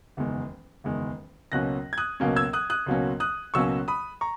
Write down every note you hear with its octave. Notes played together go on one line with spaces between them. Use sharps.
F#1 E2 D#3 G#3
F#1 E2 D#3 G#3
C#2 B2 F#3 A#3 C#4 F#6 A#6
G#6
D#6 F#6
C#2 B2 F#3 A#3 C#4
E6 G#6
D#6 F#6
D#6 F#6
C#2 B2 F#3 A#3 C#4
D#6 F#6
C#2 B2 F#3 A#3 C#4 C#6 E6
B5 D#6
A#5 C#6